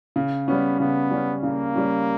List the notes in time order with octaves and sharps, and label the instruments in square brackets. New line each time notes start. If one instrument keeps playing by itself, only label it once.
[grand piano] C#3
[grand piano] G3 C#4 [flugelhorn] B3
[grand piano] C#3 [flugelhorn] B3
[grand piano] G3 C#4
[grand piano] C#3 [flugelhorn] A#3
[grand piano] G3 C#4